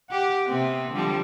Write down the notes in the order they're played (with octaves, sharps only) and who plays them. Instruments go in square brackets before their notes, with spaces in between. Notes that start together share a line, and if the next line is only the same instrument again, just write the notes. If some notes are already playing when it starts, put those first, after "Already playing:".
[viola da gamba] G4 [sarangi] F#5
[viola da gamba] C3 B3 [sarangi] C4
[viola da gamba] D3 F3 G3